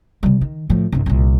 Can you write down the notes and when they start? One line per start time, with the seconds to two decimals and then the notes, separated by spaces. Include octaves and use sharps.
0.23 C3 G3
0.41 D#3
0.70 A2 F3
0.92 C2 G2
1.06 C2 A#2